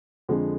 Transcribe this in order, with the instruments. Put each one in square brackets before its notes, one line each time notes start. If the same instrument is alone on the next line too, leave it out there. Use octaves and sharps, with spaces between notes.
[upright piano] F2 D3 F3 G#3